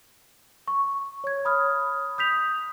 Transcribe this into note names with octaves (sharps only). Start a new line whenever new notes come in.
C#6
C#5 G#6
B5 D#6 F6
D#6 G6 B6 F7